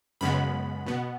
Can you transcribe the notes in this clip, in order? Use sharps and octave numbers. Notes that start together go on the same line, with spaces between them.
F#2 C#3 G#3 B3 B5
B2 B3